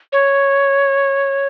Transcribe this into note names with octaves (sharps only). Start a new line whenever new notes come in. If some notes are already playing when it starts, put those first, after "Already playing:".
C#5